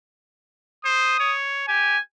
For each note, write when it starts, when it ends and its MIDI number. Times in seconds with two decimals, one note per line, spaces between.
0.85 1.20 72
0.85 1.36 87
1.20 1.68 73
1.68 1.96 67
1.68 1.99 80